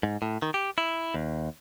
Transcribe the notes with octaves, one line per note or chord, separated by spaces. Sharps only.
G#2
A2
D#3
G4
E4
D#2